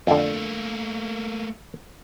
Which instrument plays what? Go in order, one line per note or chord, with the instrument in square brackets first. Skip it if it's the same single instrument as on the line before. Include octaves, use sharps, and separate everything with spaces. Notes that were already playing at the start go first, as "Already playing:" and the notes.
[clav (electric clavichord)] F2 D3 [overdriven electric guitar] A3 A#3